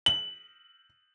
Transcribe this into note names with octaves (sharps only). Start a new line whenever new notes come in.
F#7